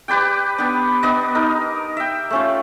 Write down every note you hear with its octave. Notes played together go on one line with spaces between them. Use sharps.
G4 B4 D5 G5
B3 D4
B3 D4 D#5
D#4 A#4 D#5
E5 G5
A3 C#4 F4